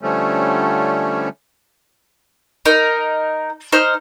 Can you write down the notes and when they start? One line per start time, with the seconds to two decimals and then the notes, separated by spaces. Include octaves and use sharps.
0.01 D3 F3 G3 A3 C#4
2.66 D#4 A#4
3.72 D#4 C5 F6